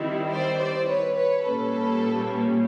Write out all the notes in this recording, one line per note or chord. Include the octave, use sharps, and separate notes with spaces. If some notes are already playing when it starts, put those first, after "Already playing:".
Already playing: D#3 G3 C4 E4
C5 D5
C5 D5
B4 C#5
B4 C#5
A#2 G3 A#3 C#4 A4 B4